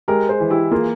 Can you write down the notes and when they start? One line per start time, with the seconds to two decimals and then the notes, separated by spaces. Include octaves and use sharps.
0.08 G#3 G4 A#4
0.29 G#4 C5
0.40 E3
0.50 E4 G4
0.71 A#3 F4 G#4